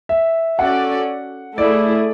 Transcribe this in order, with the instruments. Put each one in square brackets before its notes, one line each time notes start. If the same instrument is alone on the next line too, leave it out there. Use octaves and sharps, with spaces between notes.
[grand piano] E5
[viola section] C#4 F#4 A4 D5 [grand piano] F#5
[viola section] A3 E4 G#4 [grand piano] D5